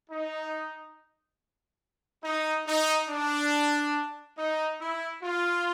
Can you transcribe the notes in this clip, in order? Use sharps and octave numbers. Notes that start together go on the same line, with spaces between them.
D#4
D#4
D#4
D4
D#4
E4
F4